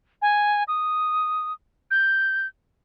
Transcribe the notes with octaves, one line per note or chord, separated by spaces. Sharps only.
G#5
D#6
G6